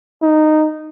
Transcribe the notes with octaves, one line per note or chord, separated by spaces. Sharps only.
D#4